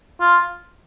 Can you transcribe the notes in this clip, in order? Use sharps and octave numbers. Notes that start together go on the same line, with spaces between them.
F4